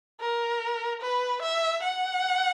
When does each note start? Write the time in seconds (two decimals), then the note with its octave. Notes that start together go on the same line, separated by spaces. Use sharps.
0.20 A#4
1.02 B4
1.42 E5
1.83 F#5